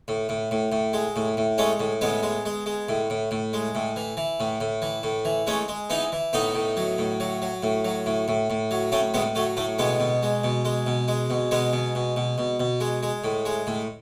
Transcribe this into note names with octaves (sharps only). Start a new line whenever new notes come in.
A2
A2
A2
A2
G#3
A2
A2
G#3 A3 C#4
A2
A2 G#3 B3
G#3
G#3
G#3
A2
A2
A2
G#3
A2
E3
E3
A2
A2
E3
A2
E3
G#3 A3 C#4
G#3
E3 B3 D#4
E3
A2 B3 D#4
A2
F#3
A2
F#3
F#3
A2
F#3
A2
A2
A2
F#3
A2 A3 C#4
A2 G#3 B3
F#3 A3
A2 A3
B2 G#3 B3
B2
G#3
B2
G#3
B2
G#3
B2
B2 G#3 B3
B2
B2
B2
B2
B2
G#3
G#3
A2
G#3
A2